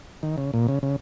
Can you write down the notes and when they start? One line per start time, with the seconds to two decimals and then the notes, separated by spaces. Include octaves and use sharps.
0.23 D#3
0.38 C#3
0.54 A#2
0.68 C#3
0.83 C#3